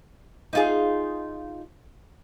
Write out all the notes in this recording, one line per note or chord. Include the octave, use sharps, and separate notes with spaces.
D#4 F4 G#4